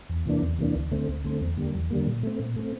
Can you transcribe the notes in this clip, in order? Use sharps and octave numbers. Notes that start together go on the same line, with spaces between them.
E2
C3 E3 A#3 D4
E2
C3 E3 A#3 D4
D2
D3 A3 C4
D2
D3 A3 C4
E2
D3 G3 A#3
E2
D3 G3 A#3
A#2
A3 C4
A#2
A3 C4